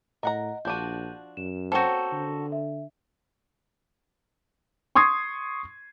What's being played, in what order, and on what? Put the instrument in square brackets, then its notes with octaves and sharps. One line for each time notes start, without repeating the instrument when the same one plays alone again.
[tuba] A2 [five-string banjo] A#4 F#5 A#5 [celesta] D#5
[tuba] A#1 [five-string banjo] F3 D4 F#4 [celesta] G6 D#7
[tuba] F#2 [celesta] E7
[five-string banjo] A#3 C4 C#4 [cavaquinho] F#4 A4 [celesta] C5 G6
[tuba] D3
[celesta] E5
[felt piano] C6 C#6 D#6 G#6 C7